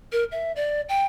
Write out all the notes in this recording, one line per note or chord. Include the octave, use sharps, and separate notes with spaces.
A#4
E5
D5
G5